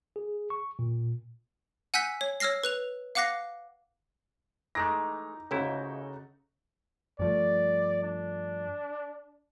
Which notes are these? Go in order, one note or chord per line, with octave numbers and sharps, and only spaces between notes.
G#4
C#6
A#2
F#5 G#5 E6 F#6 G6 B6
C#5
C#5 E6 F6 A#6 C7
B4 F#6 F7
F5 F#5 D6 F#6 A#6 C7
E3 G#3 A3 D#4 D6 A#6
C#2 G#2 C#3 A3 E4 F#4 G5
G2 F3 A3 D5
D4